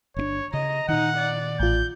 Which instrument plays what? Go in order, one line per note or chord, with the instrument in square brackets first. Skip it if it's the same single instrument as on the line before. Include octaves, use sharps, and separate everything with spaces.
[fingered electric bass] G1 C4 D4 [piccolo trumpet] C#5
[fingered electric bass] C#3 [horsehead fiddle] D#5 [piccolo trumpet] A#5
[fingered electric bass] A#2 D#3 [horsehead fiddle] D#4 [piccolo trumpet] F#5
[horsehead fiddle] D5
[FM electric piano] A1 F4 [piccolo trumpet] G6